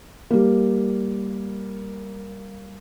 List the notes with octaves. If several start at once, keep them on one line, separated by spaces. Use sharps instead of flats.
G3 A#3